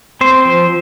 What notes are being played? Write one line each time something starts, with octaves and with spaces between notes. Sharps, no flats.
C4 C5
F3